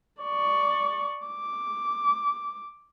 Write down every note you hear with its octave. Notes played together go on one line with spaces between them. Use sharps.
D5 C#6
D6